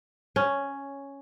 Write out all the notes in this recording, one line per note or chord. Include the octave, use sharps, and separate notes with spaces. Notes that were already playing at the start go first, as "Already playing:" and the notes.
C#4